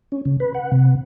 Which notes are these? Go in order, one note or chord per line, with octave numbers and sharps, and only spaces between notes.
C#4
C#3
B4
F#5
C3